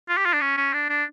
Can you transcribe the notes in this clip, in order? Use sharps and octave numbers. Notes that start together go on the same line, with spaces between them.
F4
G4
F4
D4
C#4
C#4
D4
D4